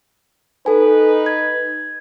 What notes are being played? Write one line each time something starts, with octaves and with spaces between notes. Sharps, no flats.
D#4 A4 B4 G#5
G#6